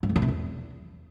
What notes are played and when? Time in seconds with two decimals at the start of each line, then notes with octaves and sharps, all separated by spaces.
0.03 G#2
0.09 F2
0.16 C#3
0.22 C3
0.28 E2